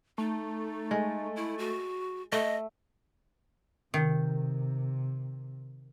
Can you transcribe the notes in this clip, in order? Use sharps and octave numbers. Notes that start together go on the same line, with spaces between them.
A3 D#4
G#3
E4
F#4
A3 D#5
C3 D#3